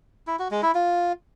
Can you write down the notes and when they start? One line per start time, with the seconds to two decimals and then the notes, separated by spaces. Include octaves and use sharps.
0.27 E4
0.39 F#4
0.51 G#3
0.63 E4
0.75 F4